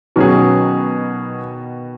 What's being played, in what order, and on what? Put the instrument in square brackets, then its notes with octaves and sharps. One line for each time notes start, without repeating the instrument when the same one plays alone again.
[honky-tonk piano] B2 D#3 [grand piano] F#3 C#4 G#4